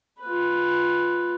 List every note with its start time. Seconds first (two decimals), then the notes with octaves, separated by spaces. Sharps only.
0.22 F4 B4